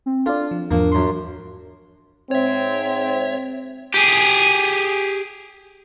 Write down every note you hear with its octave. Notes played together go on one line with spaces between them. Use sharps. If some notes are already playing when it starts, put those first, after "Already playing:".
C4
D4 F4 A4 D5
F3
E2 G#2 F3 A#3 D4
F#2 C6
G#2 C4 C#5 E5
G4 G#4